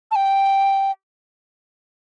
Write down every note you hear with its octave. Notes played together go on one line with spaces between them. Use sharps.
A5
G5